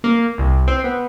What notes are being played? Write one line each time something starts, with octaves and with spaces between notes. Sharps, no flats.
A#3
C2
C4
B3